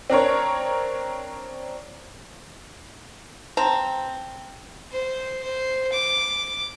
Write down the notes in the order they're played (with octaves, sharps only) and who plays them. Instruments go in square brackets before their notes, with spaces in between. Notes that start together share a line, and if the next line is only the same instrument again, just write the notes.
[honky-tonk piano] C4 D4 A#4 C#5
[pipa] C4 A5 A#5
[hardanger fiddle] C5
C5
D6